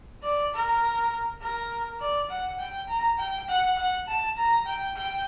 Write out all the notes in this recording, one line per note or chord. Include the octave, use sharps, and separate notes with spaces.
D5
A#4
A#4
D5
F#5
G5
A#5
G5
F#5
F#5
A5
A#5
G5
G5